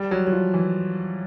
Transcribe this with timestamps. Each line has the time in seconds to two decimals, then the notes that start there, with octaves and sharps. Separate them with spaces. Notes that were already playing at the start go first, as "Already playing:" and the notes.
Already playing: G3
0.11 F#3
0.27 F#3
0.32 F3
0.54 E3